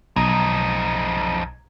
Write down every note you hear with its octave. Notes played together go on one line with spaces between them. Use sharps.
B1 F2 D#4 A#5 G#6